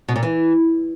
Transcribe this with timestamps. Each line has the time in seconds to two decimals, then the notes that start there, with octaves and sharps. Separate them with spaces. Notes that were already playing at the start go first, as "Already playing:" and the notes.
0.08 B2
0.16 A#2
0.23 E3